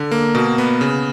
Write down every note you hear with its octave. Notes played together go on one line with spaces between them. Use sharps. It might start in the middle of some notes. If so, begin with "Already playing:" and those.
Already playing: D3
A#3
B2
B3
C#3